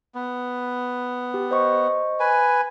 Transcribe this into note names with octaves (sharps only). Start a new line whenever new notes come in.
B3
G4
C5 D#5 C#6
B4 G#5